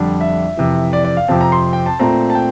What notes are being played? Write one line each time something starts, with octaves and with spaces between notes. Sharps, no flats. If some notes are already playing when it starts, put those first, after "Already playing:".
Already playing: F2 D3 G3 D4
E5
F2 C3 E3
D5
D5
F5
F2 C3 F3 C4 A5
A#5
C6
G5
A5
A#2 A3 C4 A#5
A5
G5